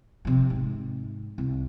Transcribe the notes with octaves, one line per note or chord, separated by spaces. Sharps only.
C3 F3
G#2
C2